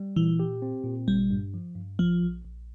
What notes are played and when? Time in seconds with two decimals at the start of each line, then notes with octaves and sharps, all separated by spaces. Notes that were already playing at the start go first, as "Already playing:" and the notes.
Already playing: G3
0.16 A#2 E3
0.40 G4
0.62 C4
0.84 A#2
1.08 G1 G3
1.30 G2
1.54 F3
1.76 G2
1.99 A#1 F3
2.22 A#1
2.44 A#1